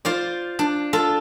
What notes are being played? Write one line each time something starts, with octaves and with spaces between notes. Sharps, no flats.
F4 C5 D5
D4
F4 A4